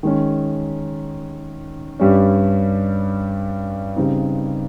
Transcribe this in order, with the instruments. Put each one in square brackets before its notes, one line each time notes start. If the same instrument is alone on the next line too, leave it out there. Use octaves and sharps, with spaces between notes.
[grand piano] D#3 G#3 C#4
G2 G3 C#4
C#3 G3 C4 D#4